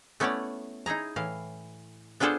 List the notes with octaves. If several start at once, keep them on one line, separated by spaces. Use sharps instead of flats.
A3 B3 C#4 E4 C#5 D5
D#4 E4 G#4 A#5
A2 E3 F5
B3 D4 F4 G#4 A4 C5